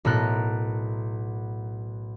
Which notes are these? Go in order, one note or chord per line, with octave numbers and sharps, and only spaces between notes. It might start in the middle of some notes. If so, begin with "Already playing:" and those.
B1 A2 A4 A#4 F#6